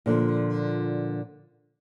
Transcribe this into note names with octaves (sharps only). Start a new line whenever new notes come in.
A#2 D3 F3